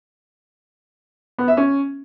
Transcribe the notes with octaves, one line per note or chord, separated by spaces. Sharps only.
B3
E5
C#4